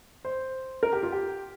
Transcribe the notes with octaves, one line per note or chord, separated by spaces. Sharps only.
C5
A#4
G4
F4
G4